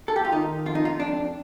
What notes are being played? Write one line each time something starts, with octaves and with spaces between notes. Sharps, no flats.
A4
G4
F4
D#3 D#4
F2 F4
D#4
F4
F2 D4